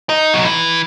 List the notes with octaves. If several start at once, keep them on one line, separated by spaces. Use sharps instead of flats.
D#4
F#3
E3